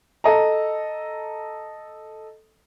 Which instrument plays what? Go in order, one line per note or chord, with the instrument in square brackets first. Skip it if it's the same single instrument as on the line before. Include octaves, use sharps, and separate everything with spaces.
[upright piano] A4 D#5 A#5